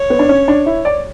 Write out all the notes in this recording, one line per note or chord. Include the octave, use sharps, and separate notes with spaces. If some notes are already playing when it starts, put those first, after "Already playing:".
Already playing: C#5
B3
D4
C#4
D4
E4
D5